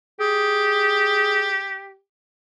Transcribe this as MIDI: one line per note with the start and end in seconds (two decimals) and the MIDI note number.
0.20 1.97 67
0.20 1.62 68